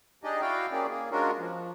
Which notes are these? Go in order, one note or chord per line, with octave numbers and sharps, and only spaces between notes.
D4 D#4 G4 G#4 D5 D#5
E4 F#4 D5 F5 G5
A#3 C#4 G4 G#4 D5
A#3 G#4
G#3 C#4 D4 F4 F#4 A#4
F3